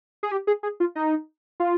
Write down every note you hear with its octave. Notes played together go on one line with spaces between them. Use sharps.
G#4
G4
G#4
G#4
F4
D#4
F4